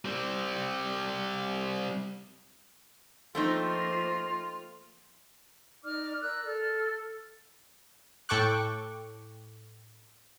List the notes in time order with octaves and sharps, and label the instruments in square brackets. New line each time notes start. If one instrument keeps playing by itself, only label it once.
[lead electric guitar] G3 C4
[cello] F3 A#3 [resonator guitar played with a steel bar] A3 C4 D#4 [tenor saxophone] F4
[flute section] D#4 D5 D6 F6
A#4 D5 E6 F#6
A4 F6
[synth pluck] A2 A4 G5 C#6 D6 F#6